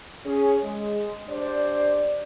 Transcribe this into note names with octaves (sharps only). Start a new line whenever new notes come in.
C#4 G#4
G#3
D4 G4 C5 D5